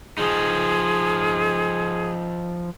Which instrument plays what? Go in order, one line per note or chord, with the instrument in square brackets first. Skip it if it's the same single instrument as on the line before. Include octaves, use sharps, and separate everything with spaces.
[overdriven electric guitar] F3 D#4 [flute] G#4